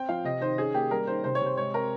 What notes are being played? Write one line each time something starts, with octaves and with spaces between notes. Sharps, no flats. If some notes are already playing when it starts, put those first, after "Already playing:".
Already playing: C4 G5
F3 F5
C3 D#5
D#3 C5
C#4 G#4
A#3 G4
G3 A#4
D#3 C5
C3 C5
C#5
C3
C5
G#3 C#5
C4 A#4